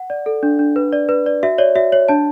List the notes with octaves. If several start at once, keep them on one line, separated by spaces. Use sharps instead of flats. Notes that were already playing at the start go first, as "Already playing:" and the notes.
Already playing: F#5
D5
A4
D4
D4
B4
D5
B4
D5
F#4 E5
C#5 D5
F#4 E5
C#5
D4 A5